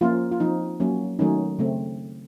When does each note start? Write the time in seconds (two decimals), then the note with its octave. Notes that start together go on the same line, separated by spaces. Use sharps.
0.01 F3 A#3 C#4 F4
0.32 F4
0.40 F3 C4 D#4
0.80 F#3 A#3 C#4
1.19 D#3 F#3 A3 C#4 D#4
1.59 C#3 A3 C4